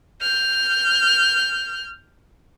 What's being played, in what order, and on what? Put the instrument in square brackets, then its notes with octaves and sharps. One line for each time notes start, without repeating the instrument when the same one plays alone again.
[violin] F6 G6